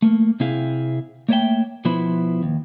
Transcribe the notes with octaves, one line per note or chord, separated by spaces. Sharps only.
A3 A#3
C3 C4 E4 G#4 F5
A3 A#3 C#5 D5 E5 G5
B2 F3 B3 E4 C5 B5
D#2